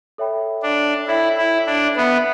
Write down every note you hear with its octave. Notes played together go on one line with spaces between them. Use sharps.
A4 C#5 E5 G5 B5
D4
E4 A4 C#5 E5 G5 B5
E4
D4
B3 B4 E5 B5